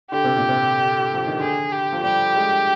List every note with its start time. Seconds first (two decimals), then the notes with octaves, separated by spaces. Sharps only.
0.11 D3 G4
0.24 C3
0.36 A#2
0.49 C3
1.14 F3
1.27 D#3
1.40 D3 G#4
1.72 G4
1.93 F3
2.03 G3 G4
2.36 G#3